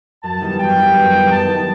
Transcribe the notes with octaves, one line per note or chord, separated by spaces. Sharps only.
F#2 A5
E3 G3 B3 D#4
F#2 G5
E3 G3 B3 D#4
F#2
E3 G3 B3 D#4
F#2 A5
E3 G3 B3 D#4